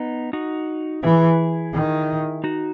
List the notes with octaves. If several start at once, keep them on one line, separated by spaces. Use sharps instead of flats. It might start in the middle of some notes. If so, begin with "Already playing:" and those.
Already playing: B3 D#4
D#4 F#4
E3 E4 G#4
D#3
D#4 F#4